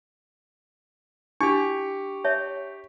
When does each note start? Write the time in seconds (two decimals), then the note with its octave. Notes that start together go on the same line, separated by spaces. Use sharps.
1.41 D4 E4 F#4 G4 C#6
2.24 C#5 E5 A5